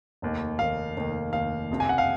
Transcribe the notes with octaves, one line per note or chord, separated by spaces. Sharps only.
F1 D#2 D#3
F1 D#2 D#3 F5
F1 D#2 D#3
F1 D#2 D#3 F5
F#1 F2 C3
G#5
F#5
F5